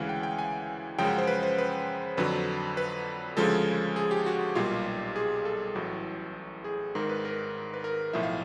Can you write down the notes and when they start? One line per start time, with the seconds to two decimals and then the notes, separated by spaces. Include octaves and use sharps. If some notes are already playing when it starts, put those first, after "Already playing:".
Already playing: D2 C#3 E3 G#3 F5 F#5
0.09 G5
0.23 G5
0.39 G#5
0.98 F#2 C#3 F3 G#3 G5
1.08 F#5
1.18 C5
1.27 B4
1.43 C5
1.58 B4
2.17 F2 D3 F#3 B4
2.77 B4
3.37 D2 C#3 F3 G#3 A4
3.96 G#4
4.11 G4
4.26 F#4
4.55 B1 A#2 G3 F4
5.16 G#4
5.45 A4
5.75 A1 A2 F#3
6.64 G#4
6.95 G#1 G#2 D#3 A#4
7.09 B4
7.25 A#4
7.74 B4
7.84 A#4
8.13 B1 A2 F3 E5
8.23 F5